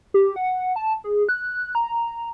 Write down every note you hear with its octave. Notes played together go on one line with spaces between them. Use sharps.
G4
F#5
A5
G#4
F#6
A#5